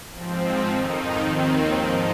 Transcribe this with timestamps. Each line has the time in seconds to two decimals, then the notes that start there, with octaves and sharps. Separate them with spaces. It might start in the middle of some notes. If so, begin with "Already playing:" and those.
0.11 G#2 F3 C4
0.64 F2 D#3 D#4
1.17 D#2 D#3 C4
1.69 G#2 F3 D#4